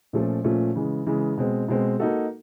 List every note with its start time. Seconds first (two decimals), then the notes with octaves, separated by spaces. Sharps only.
0.13 A#2 F3 A3 C#4 F4
0.44 A#2 F3 A3 C#4 F4
0.76 C#3 E3 G#3
1.06 C#3 E3 G#3
1.37 B2 G#3 C4
1.68 B2 G#3 C4
2.00 A#3 D#4 F#4 A4